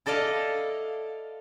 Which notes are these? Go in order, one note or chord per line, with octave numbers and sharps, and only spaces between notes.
E4 A4 D5 D#5 F5